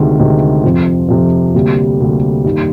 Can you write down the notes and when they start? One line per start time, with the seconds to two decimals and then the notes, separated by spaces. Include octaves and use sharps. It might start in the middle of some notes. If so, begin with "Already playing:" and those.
Already playing: D2 C3 D#3 G#3
0.19 D2 C3 D#3 G#3
0.64 F2 C3 F3
1.08 F2 C3 F3
1.54 D2 C3 G3 A#3
2.00 D2 C3 G3 A#3
2.44 G2 D#3 G3 A#3